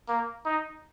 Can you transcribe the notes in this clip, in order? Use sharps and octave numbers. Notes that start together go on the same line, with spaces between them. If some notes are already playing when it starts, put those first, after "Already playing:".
A#3
D#4